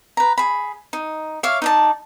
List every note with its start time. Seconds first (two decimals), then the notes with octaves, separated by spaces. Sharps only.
0.17 B4 A#5
0.38 G#4 B5
0.93 D#4
1.43 C#5 E5 F5 D6
1.62 D#4 D5 A5